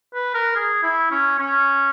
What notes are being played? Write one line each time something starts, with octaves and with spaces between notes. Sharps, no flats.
B4
A#4
G#4
E4
C#4
C#4